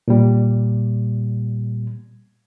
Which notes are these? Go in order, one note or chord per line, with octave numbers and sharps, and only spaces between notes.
A#2 G3